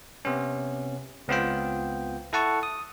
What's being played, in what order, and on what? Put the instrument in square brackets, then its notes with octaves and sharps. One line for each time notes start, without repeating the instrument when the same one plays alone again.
[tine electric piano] C3 B3 C#4
C#2 B3 C4 F4 G5
E4 A4 F#5 A5 C#6
D#6